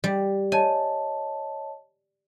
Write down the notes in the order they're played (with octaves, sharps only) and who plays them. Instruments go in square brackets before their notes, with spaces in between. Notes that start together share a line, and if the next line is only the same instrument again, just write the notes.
[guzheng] G3
[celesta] C#5 D#5 A5 [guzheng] G#5